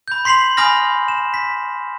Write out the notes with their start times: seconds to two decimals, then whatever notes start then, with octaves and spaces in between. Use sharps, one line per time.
0.08 B5 G6
0.25 C6 B6 C7 F7 F#7
0.57 G#5 B5 D#6 F6 A#6
1.08 E7
1.34 B6